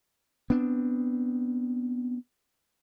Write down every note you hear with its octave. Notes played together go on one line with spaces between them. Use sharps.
B3 C4 D4